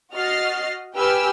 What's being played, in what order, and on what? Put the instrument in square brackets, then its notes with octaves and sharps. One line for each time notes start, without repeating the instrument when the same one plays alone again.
[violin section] F#4 D#5 F6 A6 C7
G4 B4 G5 G#5 E6 F6